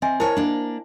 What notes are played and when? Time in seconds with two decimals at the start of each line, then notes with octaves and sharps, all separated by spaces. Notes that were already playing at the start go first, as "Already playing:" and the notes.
0.02 C4 D#5 E5 G#5
0.20 E4 A#4 C5 C#5 A5
0.37 A#3 D4